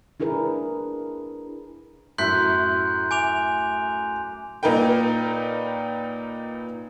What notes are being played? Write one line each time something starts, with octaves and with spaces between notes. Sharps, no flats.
D4 E4 G#4 A#4 B4
F#2 A2 C6 F#6 G6 B6
G#5 D6 F7
A#2 D#4 A#4 B4 G5